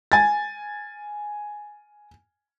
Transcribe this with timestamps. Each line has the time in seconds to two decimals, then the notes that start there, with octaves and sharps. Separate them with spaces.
0.12 G#5 A6